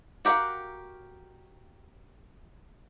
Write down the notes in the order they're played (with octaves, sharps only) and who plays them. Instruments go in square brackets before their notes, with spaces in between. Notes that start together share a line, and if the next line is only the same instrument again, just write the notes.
[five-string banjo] F#4 G4 A#4 F5 F#5